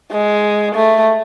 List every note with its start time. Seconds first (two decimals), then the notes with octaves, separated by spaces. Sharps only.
0.12 G#3
0.75 A3